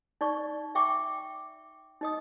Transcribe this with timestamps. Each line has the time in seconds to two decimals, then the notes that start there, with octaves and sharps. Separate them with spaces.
0.21 D#4 D5 C#6
0.75 E5 G5 C#6 D6
2.01 D#4 D#5 D#6